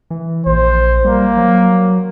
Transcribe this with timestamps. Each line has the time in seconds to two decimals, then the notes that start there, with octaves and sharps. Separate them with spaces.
0.10 E3
0.46 A#1 C5
1.05 G3 A#3
1.37 F#3